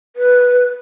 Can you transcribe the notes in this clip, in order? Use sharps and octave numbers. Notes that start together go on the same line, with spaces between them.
B4